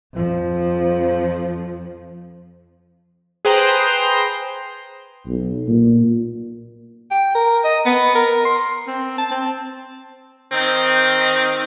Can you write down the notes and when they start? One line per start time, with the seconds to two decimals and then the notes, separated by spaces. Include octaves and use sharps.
0.14 F2 F3
3.45 G#4 B4 C5 G5 A#5 C6
5.27 B1
5.68 A#2
7.11 G5
7.35 A#4
7.64 D#5
7.86 B3
8.15 A#4
8.45 C6
8.87 C4
9.18 A5
9.31 C4
10.52 D#3 C4 D#4